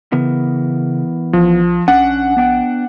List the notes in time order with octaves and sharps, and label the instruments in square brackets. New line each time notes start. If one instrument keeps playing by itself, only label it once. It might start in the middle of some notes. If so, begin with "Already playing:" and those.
[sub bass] C#3 [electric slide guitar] E3 B3 A#4
[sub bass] A#1 [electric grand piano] F3
[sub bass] A#1 [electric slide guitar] C#4 D4 [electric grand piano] F#5
[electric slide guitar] B3 D4 G5